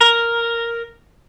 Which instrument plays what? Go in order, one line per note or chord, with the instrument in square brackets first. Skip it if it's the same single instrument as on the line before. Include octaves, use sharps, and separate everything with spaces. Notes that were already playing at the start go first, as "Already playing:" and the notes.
[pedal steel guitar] A#4